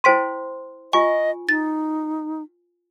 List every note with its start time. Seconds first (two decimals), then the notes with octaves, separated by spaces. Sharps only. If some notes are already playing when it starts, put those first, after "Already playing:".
0.04 E4 C5 G5 C6 B6 D#7
0.93 F4 D#5 G#5 C#6
1.49 D#4 A6